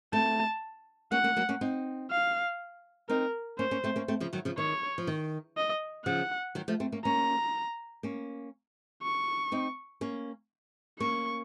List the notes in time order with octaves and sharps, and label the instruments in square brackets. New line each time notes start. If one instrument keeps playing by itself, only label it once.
[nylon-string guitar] A3 C4 [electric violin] A5
[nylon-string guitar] A#3 C#4 [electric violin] F#5
[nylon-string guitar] A#3 C#4
F#3 A#3
A#3 C#4
C4 D#4
[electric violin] F5
[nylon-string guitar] C4 D#4 [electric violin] A#4
[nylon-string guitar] A#3 C#4 [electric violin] C5
[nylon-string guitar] A#3 C#4
A3 C4
A#3 C#4
A3 C4
C#3 F3
D#3 F#3
C#3 F3
[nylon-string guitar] D#3 [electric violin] C#5
[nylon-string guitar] F3
D#3
[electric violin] D#5
[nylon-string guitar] C#3 F3 [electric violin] F#5
[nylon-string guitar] D#3 F#3
F3 A3
A3 C4
A#3 C#4
[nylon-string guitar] A#3 C#4 [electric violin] A#5
[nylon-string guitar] A#3 C#4
[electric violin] C#6
[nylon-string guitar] C4 D#4
A#3 C#4
[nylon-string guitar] A#3 C#4 [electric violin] C#6